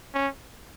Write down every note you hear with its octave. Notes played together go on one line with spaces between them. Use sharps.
C#4